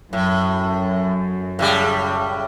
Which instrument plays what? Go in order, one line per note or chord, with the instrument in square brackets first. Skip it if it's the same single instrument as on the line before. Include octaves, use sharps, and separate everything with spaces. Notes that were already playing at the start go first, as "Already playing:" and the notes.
[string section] F#2 [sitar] A2
[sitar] A2 C#3 G3